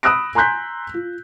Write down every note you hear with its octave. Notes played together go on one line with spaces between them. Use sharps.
B5 D#6 E6 F#6 A#6 D7
G#5 A#5 C6 F#6 G6 B6
F4